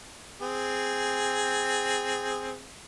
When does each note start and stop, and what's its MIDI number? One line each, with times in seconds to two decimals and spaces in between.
0.41 2.62 60
0.41 2.62 68